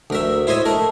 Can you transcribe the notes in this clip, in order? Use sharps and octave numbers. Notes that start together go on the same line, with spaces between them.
D2 A#4 E5
E4 C5 C#5 D#5 E5
A3 A#4